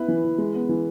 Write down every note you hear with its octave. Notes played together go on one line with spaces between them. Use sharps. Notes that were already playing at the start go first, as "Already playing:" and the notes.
Already playing: B3 E4 B4
E3
E3
G#3
B3
E3